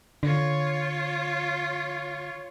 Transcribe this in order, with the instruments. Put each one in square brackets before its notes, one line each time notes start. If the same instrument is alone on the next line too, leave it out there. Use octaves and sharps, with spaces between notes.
[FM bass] D3 [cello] F4 C#5